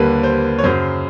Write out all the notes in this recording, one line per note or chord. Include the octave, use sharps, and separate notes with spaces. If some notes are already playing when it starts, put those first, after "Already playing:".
Already playing: D#2 D3 G3 A#3 B4
C5
C#5
F#2 C#3 F#3 C5